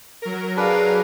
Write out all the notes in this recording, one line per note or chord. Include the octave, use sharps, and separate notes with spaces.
F#3 A#4 A#6
D4 G#4 B4 F5